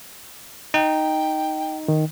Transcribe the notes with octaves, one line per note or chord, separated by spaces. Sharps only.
D#4 G5
D#3